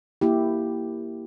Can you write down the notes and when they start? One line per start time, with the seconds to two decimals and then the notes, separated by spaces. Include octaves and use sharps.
0.21 A#3 E4 G4